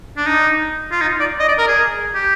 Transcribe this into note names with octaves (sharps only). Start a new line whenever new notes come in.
D4
D#4
F4
D#4
D5
D#5
D5
A#4
G#4
G4